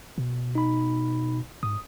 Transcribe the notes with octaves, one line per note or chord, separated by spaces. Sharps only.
B2
D#4 B5
G#2 D#6